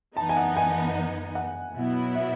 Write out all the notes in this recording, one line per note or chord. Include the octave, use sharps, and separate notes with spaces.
F#2 E3 B3 D#4 A5
G#5
F#5
G#5
F#5
B2 F#3 B3 E4
E5